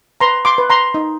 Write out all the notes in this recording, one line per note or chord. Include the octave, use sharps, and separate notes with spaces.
B4 A#5 C6
C6 D6
B4
A#5 C6
D#4